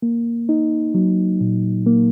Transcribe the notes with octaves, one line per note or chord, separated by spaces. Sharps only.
A#3
D#4
F#3
A#2
A#3